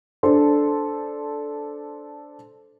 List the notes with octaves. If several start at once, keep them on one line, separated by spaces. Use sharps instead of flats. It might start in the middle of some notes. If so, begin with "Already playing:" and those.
D4 A4 C5 C6